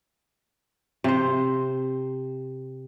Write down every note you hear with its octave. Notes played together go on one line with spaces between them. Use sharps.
C3 C5